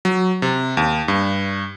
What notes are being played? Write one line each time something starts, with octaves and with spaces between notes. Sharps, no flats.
F#3
C3
D#2
G2